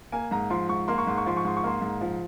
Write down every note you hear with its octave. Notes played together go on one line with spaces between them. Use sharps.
A#3 G#5
G#2 A#5
F3 C6
G#2 C#6
A#3 C6
C#6
G#2 C6
C#6
F3 C6
C#6
G#2 C6
C#6
A#3 C6
G#2
F3